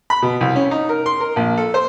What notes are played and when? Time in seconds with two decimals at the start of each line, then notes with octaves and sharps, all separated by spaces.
0.10 B5
0.22 B2
0.41 C2
0.56 C#4
0.71 D#4
0.89 A#4
1.06 C6
1.20 A#4
1.36 A#1
1.57 A4
1.74 C5